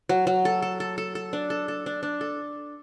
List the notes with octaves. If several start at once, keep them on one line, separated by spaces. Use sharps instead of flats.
F#3
F#3
A4
A4
A4
A4
A4
D4
A4
A4
D4
D4
A4